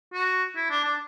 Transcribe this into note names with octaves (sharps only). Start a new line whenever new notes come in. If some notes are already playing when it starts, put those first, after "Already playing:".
F#4
E4
D4
D4